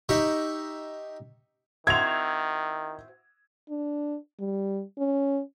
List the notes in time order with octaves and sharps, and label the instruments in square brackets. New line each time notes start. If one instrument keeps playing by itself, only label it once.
[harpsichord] D#4 G4 E5 B5 C#6
[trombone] D#3 [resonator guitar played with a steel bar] C4 E4 F#4 [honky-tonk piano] G#6 F7
[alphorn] D4
G3
C#4